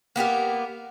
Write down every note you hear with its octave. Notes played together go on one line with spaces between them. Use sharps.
A#3 B3 G4 A#4